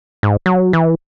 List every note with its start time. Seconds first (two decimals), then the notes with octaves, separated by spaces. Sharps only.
0.23 G#2
0.46 F#3
0.73 E3